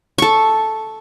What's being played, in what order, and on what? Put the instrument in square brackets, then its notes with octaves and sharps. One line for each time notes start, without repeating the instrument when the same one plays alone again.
[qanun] A4 C#6